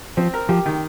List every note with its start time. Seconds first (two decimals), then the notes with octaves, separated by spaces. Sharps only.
0.17 F3 C4
0.34 A#4
0.49 F3 G4
0.66 D#3